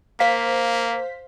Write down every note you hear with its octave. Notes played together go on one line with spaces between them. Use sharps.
A#3 C5 F5 B6